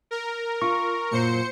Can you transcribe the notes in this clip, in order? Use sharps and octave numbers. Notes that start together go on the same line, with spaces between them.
A#4
F4 C#6
F#2 A#2 F#3 C5 C#7